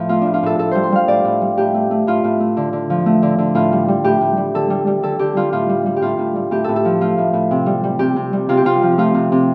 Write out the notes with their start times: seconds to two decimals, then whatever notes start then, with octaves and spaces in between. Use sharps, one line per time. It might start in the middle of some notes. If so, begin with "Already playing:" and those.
Already playing: A2 F3
0.09 A3 F4
0.21 A2 D4
0.34 F4
0.43 A2 A4
0.59 A2 A4
0.71 G3 C5
0.83 C6
0.92 G3 F5
1.08 A2 D5
1.25 A2
1.41 G3
1.57 A2 G4
1.74 A3
1.91 A3
2.07 A2 F4
2.24 A2
2.40 A3
2.57 D3
2.73 D3
2.90 F3
3.06 A3
3.22 D3
3.38 D3
3.55 A2 F4
3.72 G3
3.88 G3
4.04 A2 G4
4.21 A2
4.37 G3
4.54 D3 A4
4.70 G3
4.87 G3
5.03 D3 A4
5.19 D3 G4
5.36 G3 F4
5.53 A2 F4
5.69 G3
5.86 G3
5.96 G4
6.02 A2 F4
6.19 A2
6.35 G3
6.51 A2 G4
6.64 A2 A4
6.76 A4
6.85 F3
7.01 A3 F4
7.18 A2
7.33 A2
7.51 C3
7.66 G3
7.84 G3
7.99 C3 G4
8.16 C3
8.33 G3
8.49 C3 F4
8.57 G4
8.65 C3 F4
8.82 F3
8.98 A3 F4
9.14 C3
9.32 C3